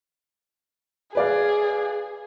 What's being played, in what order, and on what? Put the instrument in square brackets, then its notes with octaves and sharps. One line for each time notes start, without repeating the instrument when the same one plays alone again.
[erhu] G#4 [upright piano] B4 D5 F5